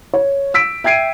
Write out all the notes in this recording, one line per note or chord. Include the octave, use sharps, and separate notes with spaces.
C#5
E6 B6 D7
E5 G5 G#6 C7 D7 D#7